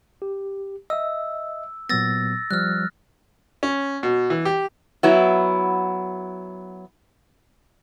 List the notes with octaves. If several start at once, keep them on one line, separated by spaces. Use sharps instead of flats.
G4
D#5 E5 E6
A#2 F#3 B3 E6 A6 A#6
F3 G3 F6 F#6
C#4
B2
E3
G4
F#3 B3 E4